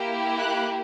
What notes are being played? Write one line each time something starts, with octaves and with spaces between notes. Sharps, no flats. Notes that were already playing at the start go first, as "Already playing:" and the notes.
Already playing: A#3 E4 G4
F#6